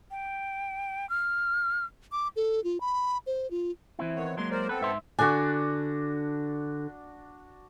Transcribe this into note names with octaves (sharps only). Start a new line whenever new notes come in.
G5
F6
D6
A4
F4
B5
C5
F4
E3 C4 E4
D#3 B3 C#5
F#3 G#3 A#3 C6
A#4 C5 D5
B3 C4 A4 B4
G#2 E5 C6
D3 D4 F#4 G#5